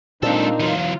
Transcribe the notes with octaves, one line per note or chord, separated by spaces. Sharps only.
A#2 G#3 C4 D4 D#4 F4 A4
E3 F#3 F4